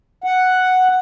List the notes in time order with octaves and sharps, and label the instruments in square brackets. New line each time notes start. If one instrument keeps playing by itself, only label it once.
[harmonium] F#5